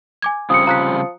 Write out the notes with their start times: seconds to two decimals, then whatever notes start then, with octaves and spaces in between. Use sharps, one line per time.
0.22 G#5 D6 G#6
0.50 C#3 F3 G3 C4 D#6 C#7
0.67 F3 A#5 F#6 B6